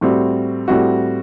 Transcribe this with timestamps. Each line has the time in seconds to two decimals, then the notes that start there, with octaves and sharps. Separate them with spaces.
0.01 A2 G3 C4 F#4
0.68 A2 G3 C4 F#4